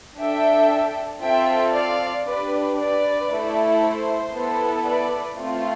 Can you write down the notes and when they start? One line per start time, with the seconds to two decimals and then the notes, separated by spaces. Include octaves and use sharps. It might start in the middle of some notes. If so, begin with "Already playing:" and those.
0.19 D4 A4 E5 G5
1.22 C4 F4 A4 E5 G5
1.74 D5 F5
2.26 D4 G4 B4 D5
2.78 B4 D5
3.30 A3 E4 A4
3.82 C5
4.33 B3 E4 A4
4.85 B4 D5
5.37 A3 C4 F4